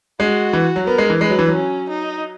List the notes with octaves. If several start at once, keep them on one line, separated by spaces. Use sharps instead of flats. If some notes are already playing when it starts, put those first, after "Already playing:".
G#3 F#4
E3
F#3
B3 A#4
G#3
E3
G#3 B4
F#3
E3
F#3
C#4
D#4